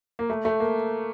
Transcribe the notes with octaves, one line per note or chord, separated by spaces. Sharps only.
A#3
A3
A3
A#3